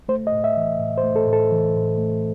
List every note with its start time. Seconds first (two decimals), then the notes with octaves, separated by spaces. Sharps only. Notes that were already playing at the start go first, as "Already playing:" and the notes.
0.09 A3 C5
0.27 D#5
0.32 A2
0.44 E5
0.57 E3
0.79 A2
0.97 C5
1.04 A3
1.16 A4
1.27 A2
1.33 A4
1.52 E3
1.75 A2
1.98 A3